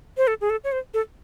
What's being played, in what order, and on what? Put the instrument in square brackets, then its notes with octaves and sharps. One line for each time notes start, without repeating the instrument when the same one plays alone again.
[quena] C5
A4
G#4
A4
C#5
C5
A4